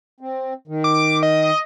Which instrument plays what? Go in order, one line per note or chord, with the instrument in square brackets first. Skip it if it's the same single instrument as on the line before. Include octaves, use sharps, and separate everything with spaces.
[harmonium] C4
D#3
[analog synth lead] D6
D#5